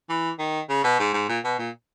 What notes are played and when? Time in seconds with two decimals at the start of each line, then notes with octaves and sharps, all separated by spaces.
0.09 E3
0.39 D#3
0.69 C#3
0.84 B2
0.99 G#2
1.13 G#2
1.29 A#2
1.44 B2
1.59 A#2